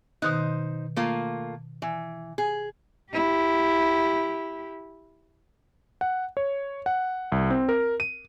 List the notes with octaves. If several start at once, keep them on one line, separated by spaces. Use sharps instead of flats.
B2 D#3 D#4 C5 F#6
A3 A#3 F4
E3
G#4
E4 G4
F#5
C#5
F#5
C2
C4
A#4
D#7